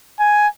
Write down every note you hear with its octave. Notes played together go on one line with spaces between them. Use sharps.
G#5